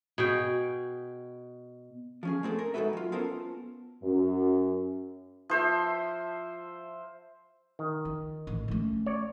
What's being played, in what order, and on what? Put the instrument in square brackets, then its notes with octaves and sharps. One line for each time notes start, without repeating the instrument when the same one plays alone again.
[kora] B2 G#4 G5
[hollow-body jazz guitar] F3 C#4 G#4
A3 C4 E4 G#4 A4
A#4
G#3 D#4 F#4 A4 B4 E5
F#3 F4
B3 C#4 F4 A4 A#4 C5
[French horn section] F#2
[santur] F3 C5 E5
[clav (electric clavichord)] D#3
[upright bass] F4
A1
A3 C#4
[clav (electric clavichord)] C#5 D5